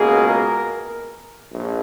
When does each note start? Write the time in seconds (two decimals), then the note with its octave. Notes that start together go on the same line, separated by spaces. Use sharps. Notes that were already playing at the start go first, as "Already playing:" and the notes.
Already playing: C#2 B2 A#3 G#4
0.28 A#4
1.52 A#1